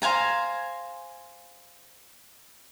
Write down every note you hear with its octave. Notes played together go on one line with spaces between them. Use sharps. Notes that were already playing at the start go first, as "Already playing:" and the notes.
C5 F5 G#5 A#5